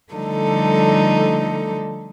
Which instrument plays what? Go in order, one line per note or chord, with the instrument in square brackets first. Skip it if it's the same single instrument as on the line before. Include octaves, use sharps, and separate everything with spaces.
[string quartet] D3 F3 G3 A3 D#4 A4